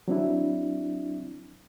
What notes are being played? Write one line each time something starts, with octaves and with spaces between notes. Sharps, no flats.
F#3 C4 D4 E4